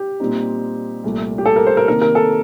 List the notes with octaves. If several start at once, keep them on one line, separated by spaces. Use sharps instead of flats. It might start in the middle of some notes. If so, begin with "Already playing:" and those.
Already playing: G4
A#2 G3 C4 D#4
C2 A#2 A3
G4
A4
A#4
C5
A#4
C3 D#3 A#3 D#4 A#4
A#4
A4